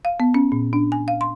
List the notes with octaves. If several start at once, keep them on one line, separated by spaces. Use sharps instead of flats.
F5
B3
C#4
A#2
D4
G#5
F5
C6